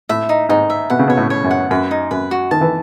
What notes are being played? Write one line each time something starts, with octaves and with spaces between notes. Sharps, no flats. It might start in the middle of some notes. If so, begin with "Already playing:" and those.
A2 E5
D#4
G#2 D#4
E5
B2 F#5
C#3
B2 C#5
A2
C#5
F#2
F#5
F#2 B4
D#4
F#2 B4
F#4
D#3 A5
E3